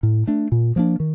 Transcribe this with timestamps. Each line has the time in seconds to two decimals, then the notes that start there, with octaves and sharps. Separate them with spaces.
0.03 A2
0.27 A3 D4
0.52 A#2
0.76 F3 A#3 D4
1.00 D#3